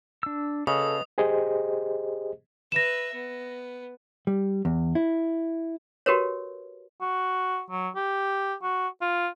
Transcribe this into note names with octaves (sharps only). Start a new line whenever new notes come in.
D4 E6
C#3 A4 B4 D#5 D#6
G4 G#4 C5 D#5
B4 E5 A#6 E7
B3
G3
E2
E4
F#4 G4 A#4 B4 C#5
F#4
F#3
G4
F#4
F4